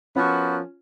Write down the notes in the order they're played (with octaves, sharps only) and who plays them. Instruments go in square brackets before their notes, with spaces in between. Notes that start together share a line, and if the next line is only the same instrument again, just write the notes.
[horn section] F3 B3 F#4 A#4 [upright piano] C#4 F4